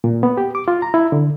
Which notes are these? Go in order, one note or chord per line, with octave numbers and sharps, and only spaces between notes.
A#2
B3
G4
D6
F4
A#5
E4
D3